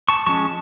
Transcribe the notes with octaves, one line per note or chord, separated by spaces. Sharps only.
A5 C#6
F3 G#3 C#4 A5 C#6